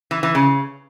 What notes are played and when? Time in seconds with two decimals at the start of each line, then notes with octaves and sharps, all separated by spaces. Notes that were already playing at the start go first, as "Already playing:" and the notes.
0.11 E3
0.23 E3
0.35 C#3